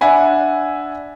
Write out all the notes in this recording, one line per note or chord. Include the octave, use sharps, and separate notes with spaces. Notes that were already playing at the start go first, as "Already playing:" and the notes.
D4 E5 F#5 G#5 B5